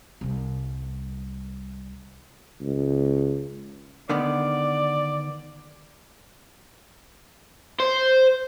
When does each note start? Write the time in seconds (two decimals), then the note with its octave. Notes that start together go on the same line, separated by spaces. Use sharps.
0.21 C2 G3
2.61 C#2
4.09 D3 D#3 B3 D5
7.80 C5